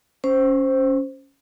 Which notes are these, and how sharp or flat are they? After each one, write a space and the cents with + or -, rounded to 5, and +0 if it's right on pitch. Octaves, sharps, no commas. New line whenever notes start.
C#4 +0 C5 +0